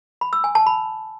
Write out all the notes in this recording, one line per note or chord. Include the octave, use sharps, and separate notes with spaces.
B5
E6
G#5
A5
B5